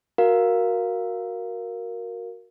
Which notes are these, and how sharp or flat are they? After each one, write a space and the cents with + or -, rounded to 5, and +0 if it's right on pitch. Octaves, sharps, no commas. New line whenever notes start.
F#4 -5 A#4 +0 F5 +0